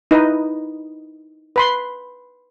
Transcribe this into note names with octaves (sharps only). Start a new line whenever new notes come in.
D#4 E4 B4 D#5
B4 B5 C6